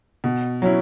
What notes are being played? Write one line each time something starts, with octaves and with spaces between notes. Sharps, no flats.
B2
F#3 C#4 E4